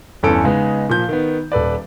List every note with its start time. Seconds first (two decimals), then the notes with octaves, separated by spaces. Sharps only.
0.23 G1 E2 C#4 A4 D7
0.44 C#3 G#3 B3 D#4
0.89 A#2 F3 G6
1.08 D#3 B3
1.52 D#1 A4 B4 D5